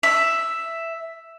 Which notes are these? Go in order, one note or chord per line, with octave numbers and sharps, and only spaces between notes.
E5